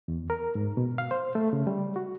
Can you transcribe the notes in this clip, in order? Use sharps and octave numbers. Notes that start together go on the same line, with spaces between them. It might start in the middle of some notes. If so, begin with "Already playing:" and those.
E2
A#4
G#2
B2
F5
C5
A3
C#3
G3
F#4